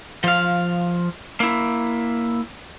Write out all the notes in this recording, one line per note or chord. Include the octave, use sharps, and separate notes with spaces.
F3 F5
A#3 E4